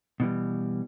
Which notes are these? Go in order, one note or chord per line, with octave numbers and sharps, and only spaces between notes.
B2 E3 G3